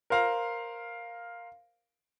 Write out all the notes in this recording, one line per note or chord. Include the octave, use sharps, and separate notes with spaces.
A#4 C5 F5 A#5